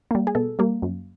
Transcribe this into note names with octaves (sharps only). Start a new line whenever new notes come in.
G3 A#3
G#4
B2 A4
G3 A#3
F#2